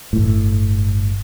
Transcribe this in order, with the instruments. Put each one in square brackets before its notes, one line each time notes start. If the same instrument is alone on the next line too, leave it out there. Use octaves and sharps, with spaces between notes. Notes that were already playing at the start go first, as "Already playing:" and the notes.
[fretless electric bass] G1 A2